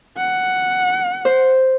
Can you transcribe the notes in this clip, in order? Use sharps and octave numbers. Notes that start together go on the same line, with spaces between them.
F#5
C5